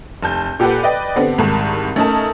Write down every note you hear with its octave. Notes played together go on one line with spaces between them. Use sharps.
F1 A5 G6
A#2 G4 A4 B4 F#5
B4 D5 D#5 G5
D3 B3 C4 G4
C2 G#2 D#3 A5
A3 C#4 D#4 A#4 A5